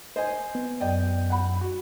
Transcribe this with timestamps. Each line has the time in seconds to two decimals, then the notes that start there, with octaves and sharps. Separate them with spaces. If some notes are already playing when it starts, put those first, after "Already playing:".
0.16 C5 D#5 G#5
0.55 B3
0.80 F#2 D5 D#5 G5
1.30 F#5 B5
1.61 F#4